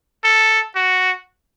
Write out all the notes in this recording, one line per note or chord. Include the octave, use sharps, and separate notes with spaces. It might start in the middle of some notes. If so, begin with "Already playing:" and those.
A4
F#4